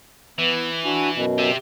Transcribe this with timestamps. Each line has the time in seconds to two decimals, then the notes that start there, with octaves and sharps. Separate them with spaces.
0.38 E3 B3
0.85 D4 F#4 G#5
1.15 F#2 B2
1.38 G4 E5